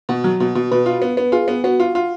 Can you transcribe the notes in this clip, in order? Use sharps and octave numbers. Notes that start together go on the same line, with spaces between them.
B2 F#4
F#3
B2
B2
B2 B4
F4
B3
B3
F4 G#4
B3
B3 F#4
F4
F4